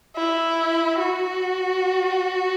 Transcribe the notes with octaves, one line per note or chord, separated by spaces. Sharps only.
E4
F#4